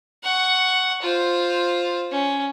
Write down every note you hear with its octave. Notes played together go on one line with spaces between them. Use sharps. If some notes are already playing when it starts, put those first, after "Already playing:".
F#5 C#6
F4 C5
C#4